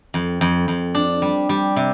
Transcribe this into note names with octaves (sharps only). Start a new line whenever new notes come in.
F2
F2
F2
D4
G3
G3
C3